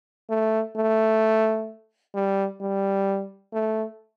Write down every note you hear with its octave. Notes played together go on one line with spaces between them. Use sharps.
A3
A3
G3
G3
A3